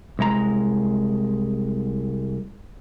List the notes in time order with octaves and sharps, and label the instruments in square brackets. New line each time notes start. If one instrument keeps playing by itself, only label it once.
[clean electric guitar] C2 G#3 A#5